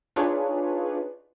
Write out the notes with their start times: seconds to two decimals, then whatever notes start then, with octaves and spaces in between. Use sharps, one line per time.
0.16 D4 D#4 F4 G#4 B4 C#5